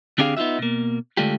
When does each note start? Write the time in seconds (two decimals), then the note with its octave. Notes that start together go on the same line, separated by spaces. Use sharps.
0.18 D3 C4 D4 G4 G#4 F5
0.37 B3 D#4 F4 F#4 E5
0.59 B2 A#3
1.17 D3 G#3 A3 D4 F4 G4